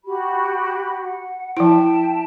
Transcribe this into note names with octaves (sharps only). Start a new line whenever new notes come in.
F#4 G4 B5
F#5
F3 E4 E5 G5 A5